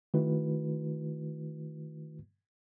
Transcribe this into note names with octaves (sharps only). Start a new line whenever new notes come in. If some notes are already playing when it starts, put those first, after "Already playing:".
D#3 A3 E4 F#4 B4